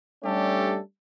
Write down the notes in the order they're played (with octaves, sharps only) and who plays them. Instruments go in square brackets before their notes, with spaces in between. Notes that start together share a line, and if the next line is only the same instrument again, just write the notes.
[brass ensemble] G3 A3 C#4 D4 G4 A4